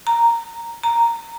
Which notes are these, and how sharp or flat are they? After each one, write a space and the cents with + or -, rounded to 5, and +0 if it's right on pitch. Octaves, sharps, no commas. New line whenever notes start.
A#5 +0
A#5 +0